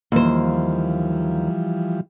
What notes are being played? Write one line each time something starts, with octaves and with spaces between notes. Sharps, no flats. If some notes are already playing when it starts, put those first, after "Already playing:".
D#2 E3 F3 G3 C5